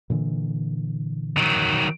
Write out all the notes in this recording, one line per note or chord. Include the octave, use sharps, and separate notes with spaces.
A#2 D3 E3
D#3 F#3